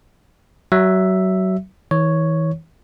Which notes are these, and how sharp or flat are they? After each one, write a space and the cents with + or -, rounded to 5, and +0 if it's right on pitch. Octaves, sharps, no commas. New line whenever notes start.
F#3 +25 E5 +0
E3 -40 C#5 +0